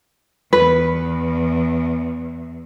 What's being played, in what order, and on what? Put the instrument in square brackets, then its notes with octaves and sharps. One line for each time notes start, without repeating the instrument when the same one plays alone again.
[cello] E2 [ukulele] B4